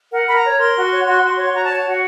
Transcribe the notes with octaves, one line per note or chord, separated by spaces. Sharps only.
A#4 F#5
A#4 B5
A#5
C#5
A#4 C6
F#4
C#5
F#4
F#4
C#5
F#4 A#5
A5
C#5
A5
F#4 F#5